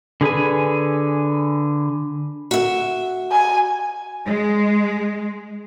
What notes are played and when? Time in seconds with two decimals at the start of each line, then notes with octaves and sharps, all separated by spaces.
0.21 D3 G#4 B4 G#5
2.51 F#4 E5
3.31 G#5
4.25 G#3